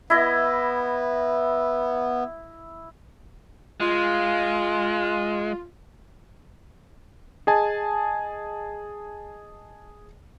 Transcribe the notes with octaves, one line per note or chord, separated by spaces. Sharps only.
B3 E4 D#5
G#3 F4
G#4 D#5 G#5 A5